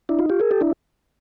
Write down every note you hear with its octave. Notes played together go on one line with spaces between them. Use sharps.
D4 E4
D#4 F4
F4 G4
G#4 A#4
G4 A4
D4 E4